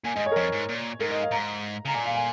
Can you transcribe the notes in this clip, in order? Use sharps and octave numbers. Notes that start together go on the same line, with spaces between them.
A#2 G#5
G#2 D#5
C#5
A#4
F2 C#5
G#2
A#2
G#2 A#4
D#5
F5
G#2 A#5
C#3 A#5
A#2 G#5
F5
G#5